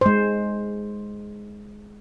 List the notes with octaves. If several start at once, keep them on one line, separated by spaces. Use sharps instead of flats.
G#3 C5